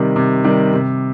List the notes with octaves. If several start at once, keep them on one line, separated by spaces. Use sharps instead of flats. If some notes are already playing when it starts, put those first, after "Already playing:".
Already playing: C3 D#3 G3
C3
D#3 G3
C3